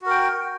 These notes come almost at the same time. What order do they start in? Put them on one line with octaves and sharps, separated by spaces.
F#4 A#4 G5